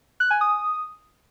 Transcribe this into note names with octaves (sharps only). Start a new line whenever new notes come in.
F#6
G#5
D#6